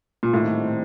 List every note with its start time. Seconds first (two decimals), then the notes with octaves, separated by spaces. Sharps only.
0.23 A#2
0.33 A2 D#3 G3 C4 D#4